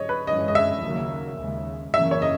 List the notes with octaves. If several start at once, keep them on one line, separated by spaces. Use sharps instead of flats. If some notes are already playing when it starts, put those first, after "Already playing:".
Already playing: C#5 D#5
B4
F#2 E3 G#3 C#4 D#5
D#5
E5
D#2 C#3 F#3 A#3
D#2 C#3 G#3
F#2 C#3 E3 A#3 C#4 E5
C#5
D#5